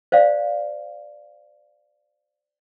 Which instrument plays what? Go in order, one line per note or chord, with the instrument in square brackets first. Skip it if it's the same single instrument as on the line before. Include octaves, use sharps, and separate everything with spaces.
[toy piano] C5 D5 F5